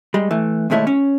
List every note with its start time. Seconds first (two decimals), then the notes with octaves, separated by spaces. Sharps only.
0.14 G3 G#3
0.31 E3 A3
0.70 D#2 B2 G#3 A3 E4 C#5
0.87 C#4 C#5